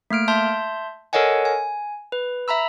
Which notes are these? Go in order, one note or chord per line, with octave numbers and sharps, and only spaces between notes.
A3 A#3 F6 D7
E5 A5 C6 G6
A4 A#4 C#5 D#5 F#5 G#5
G#5
B4
E5 A#5 B5 E6